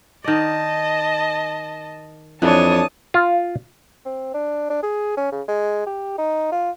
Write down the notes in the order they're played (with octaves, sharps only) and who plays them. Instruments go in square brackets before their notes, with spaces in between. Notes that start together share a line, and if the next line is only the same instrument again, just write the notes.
[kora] D#3 D5 [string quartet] D#5 A5
[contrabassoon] F2 [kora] E3 [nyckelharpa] D4 C#5 [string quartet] A5 D#6
[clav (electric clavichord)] F4
[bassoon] C4
D4
D4
G#4
C#4
C#3
G#3
G4
D#4
F4